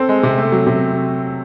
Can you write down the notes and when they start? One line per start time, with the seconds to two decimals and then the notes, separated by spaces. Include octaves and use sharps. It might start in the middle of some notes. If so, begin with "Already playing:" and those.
Already playing: C4 A4
0.09 G#3
0.23 C3
0.38 A3
0.52 F#3
0.67 C3